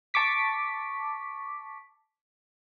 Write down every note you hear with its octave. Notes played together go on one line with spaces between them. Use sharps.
A5 C#6 D6 B6